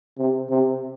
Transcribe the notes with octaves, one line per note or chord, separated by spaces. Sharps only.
C3
C3